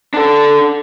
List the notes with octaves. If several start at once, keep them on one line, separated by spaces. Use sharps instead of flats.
D4 A4